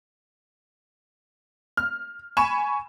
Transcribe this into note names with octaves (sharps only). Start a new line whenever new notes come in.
F6
G#5 B5 C#6 E7